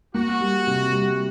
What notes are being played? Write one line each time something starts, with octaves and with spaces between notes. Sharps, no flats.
A#3 F#4
G3
C3
G3